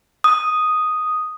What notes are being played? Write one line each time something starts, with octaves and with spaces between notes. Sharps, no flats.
D#6